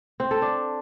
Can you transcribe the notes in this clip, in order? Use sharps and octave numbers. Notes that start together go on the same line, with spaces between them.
C4
A4
D4